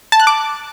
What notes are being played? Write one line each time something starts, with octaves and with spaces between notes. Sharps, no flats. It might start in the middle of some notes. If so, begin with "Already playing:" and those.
A5
F#6
D6